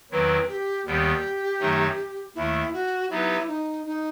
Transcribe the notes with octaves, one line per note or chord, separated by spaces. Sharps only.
E2 D#3 F#3 C4 E4 B4
G4
D#2 D#3 G3 B3 G4
F#2 D#3 F#3 A3 D#4
D#2 D#3 A3 E4
F#4
F#3 B3 D#4 E4 G4 B4
D#4
D#4